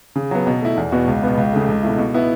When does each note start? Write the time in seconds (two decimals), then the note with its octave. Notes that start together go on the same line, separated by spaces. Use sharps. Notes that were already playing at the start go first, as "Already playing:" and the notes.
0.16 C#3
0.31 F#3 B3
0.47 B2
0.62 A3 E4
0.77 E2
0.92 B2 B3 F#4
1.07 C#2
1.23 B2 B3
1.37 C#2
1.53 C#3 A3
1.68 C#2
1.83 B2 A3 E4
1.98 B2
2.14 B3 E4